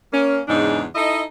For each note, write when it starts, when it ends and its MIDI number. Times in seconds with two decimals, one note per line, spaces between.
0.12 0.39 58
0.12 0.39 61
0.48 0.83 40
0.48 0.83 44
0.48 0.83 49
0.48 0.83 62
0.48 0.83 63
0.96 1.22 63
0.96 1.22 64
0.96 1.22 69
0.96 1.22 75